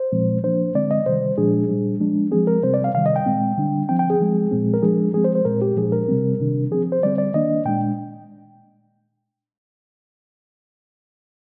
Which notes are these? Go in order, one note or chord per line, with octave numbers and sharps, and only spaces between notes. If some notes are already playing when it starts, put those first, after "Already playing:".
Already playing: C5
A#2 F3 G#3 C4
F3 A#3 D4 C5
D3 G#3 C4 D5
D#5
C3 D#3 G3 C5
A#2 F3 G#3 D4 G#4
A#2 G3 D4
F3 G#3 D4
F3 G#3 C4 G#4
A#4
C3 G3 C4 C5
D5
F5
C3 D#3 G3 F5
D#5
G5
A#2 G#3 C4
D3 G3 D4
F3 C4 G5
G5
G#4
F3 G#3 C4
A#2 F3 G#3 C4
A#4
F3 G#3 D4 G#4
F3 G#3 C4 G#4
C5
C5
A#2 G#3 C4 A#4
G4
A#2 F3 G#3 D4 G#4
A#4
C3 G3 C4
C3 D#3 G3 D4
F3 C4 G#4
C5
D3 G3 C4 D5
D5
D#3 A#3 D4 D#5
A#2 G#3 D4 G5